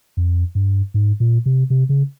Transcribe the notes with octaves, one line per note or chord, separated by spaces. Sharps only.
F2
G2
G#2
A#2
C3
C3
C#3